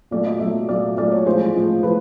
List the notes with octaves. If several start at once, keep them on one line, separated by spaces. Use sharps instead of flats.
A#2 F#3 A3 D5
D#5
A#2 F#3 A3 E5
A#2 F#3 A3 D5
A#2 F#3 A3 D5
C#5
A2 F3 G#3 C5
A2 F3 G#3
A2 F3 B4